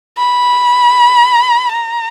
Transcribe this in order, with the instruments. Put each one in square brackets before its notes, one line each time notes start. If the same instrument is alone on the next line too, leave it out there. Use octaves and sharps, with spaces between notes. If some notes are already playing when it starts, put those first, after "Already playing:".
[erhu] B5
A#5